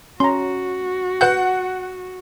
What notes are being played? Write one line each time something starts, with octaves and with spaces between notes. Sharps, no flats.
C#4 F#4 A#5 C6
B4 F#5 F#6 G6